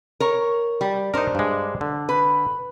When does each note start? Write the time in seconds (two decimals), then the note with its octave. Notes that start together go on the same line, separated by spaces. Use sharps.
0.20 A#4 C#5
0.81 G3
1.14 D4 D#4 A#4 C5
1.35 G2 G#3
1.81 D3
2.09 B4